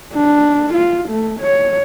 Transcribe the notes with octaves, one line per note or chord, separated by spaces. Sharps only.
D4
F4
A3
C#5